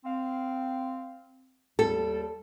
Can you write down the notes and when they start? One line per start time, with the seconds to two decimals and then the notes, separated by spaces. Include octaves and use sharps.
0.05 C4 F5
1.79 D#2 G3 A4